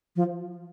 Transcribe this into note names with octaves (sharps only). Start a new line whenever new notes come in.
F3